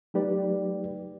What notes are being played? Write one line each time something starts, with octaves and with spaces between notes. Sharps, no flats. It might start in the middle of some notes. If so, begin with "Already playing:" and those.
F#3 A3 D#4 G4 B4 D5